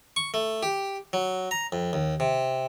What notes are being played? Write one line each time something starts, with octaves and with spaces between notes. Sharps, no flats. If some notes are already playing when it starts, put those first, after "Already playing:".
C#6
A3
G4
F#3
A#5
F2
D#2
C3